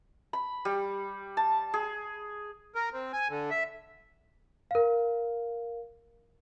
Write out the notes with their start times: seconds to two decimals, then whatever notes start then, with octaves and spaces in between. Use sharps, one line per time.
0.33 B5
0.65 G3
1.37 A5
1.74 G#4
2.75 A#4
2.93 C4
3.13 G#5
3.29 D3
3.51 E5
4.71 A#4 F5